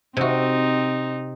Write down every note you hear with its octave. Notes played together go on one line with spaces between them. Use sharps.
C3 C4 D#4 F#4